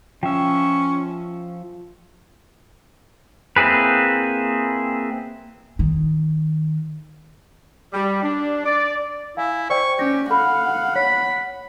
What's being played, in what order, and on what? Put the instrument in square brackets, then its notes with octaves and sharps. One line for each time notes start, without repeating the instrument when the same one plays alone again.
[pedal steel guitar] F3 E5 [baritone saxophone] C#4 [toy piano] G5
[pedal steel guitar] A#3 C4 E4 G#4 B4
[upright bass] D#3
[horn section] G3
D4
D5
[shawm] E4 [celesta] F5 G#5
[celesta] C5 D5 G5 [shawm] C#6
[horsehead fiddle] C#4 [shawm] G4 [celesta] A#6
[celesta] A4 B5 [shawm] F5 [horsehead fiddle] F#5
[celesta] C#5 [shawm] B5